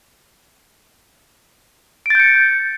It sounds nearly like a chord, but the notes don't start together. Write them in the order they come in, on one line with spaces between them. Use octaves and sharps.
D7 A6 G6 C#7